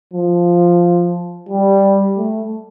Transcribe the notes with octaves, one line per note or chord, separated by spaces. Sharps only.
F3
G3
A3